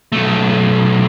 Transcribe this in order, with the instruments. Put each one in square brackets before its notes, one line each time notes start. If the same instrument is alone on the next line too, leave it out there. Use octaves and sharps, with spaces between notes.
[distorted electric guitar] B1 A3